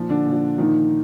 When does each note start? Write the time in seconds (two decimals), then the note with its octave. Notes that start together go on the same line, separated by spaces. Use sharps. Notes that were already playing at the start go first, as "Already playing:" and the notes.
Already playing: A#2 F3
0.09 D3 D4
0.26 A#2 F3
0.58 A#2 D#3 F3 D#4